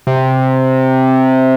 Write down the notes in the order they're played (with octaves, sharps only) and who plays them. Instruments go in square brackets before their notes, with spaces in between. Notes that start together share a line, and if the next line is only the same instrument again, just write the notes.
[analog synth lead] C3